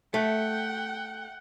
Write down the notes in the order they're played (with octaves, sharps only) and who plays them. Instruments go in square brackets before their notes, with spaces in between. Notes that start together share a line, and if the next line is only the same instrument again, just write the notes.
[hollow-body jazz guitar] A3 [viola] F#5 G5